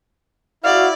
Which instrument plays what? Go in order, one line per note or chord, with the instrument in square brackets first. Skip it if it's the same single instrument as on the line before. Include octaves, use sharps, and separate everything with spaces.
[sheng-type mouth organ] E4 [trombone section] F#4 [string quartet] D5 [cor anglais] F5